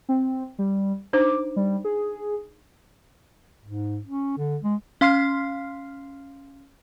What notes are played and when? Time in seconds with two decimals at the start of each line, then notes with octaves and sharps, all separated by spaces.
0.09 C4
0.59 G3
1.13 D4 D#4 C5 D6
1.56 G3
1.85 G#4
3.65 G#2
4.06 C#4
4.37 D3
4.63 G#3
5.01 C#4 F5 C6 F6 C7